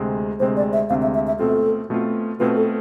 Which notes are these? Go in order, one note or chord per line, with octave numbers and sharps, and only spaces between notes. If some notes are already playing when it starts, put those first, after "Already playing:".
Already playing: D2 C3 G#3 C4
D2 C3 G#3 C4 C5
D5
E5
D2 C3 G#3 C4 F5
E5
E5
E5
B2 A3 C4 F4 A4
B2 A3 C4 F4
B2 A3 C4 F4 B4
A4